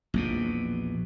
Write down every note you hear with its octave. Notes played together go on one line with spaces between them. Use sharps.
A#1 E2 B2